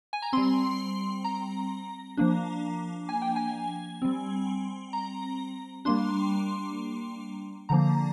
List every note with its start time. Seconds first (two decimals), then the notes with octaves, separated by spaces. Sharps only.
0.13 G#5
0.22 A#5
0.33 G3 C4 C6
1.24 A#5
2.17 F3 A#3 D4
3.09 G#5
3.22 G5
3.36 G#5
4.02 G3 C4
4.93 A#5
5.85 G3 A#3 D4 C6
7.69 D3 F3 A#3 A#5